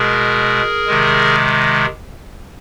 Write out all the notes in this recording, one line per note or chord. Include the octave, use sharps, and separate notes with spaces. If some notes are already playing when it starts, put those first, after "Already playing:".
Already playing: B2 G#3 G#4 A#4
C3 D#3 G#3